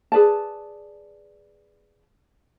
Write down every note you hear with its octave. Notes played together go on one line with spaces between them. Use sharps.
G#4 B4 D5 A5